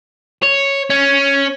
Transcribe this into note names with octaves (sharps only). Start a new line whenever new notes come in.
C#5
C#4